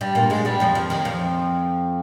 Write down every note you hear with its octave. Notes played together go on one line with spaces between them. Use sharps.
G2 G3
A#2 A#3
G#2 G#3
G2 G3
F2 F3
F2 F3
D#2 D#3
F2 F3